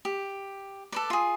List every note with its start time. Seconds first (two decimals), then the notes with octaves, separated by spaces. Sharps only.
0.05 G4
0.92 A4 B4 D5
1.10 F4 G#4